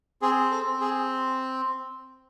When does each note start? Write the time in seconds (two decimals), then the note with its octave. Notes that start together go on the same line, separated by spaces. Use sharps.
0.22 C4 G#4
0.51 A4
0.66 C4
0.81 G#4